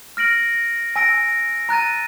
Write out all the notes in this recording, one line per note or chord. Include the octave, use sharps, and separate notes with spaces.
F6 A#6 D7 F#7
G#5 E6 A#6 D7
A#5 F#6 A6 D#7